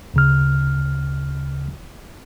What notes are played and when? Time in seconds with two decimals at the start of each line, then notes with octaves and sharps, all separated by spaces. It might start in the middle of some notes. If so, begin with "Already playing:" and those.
0.14 D2 C#3 F6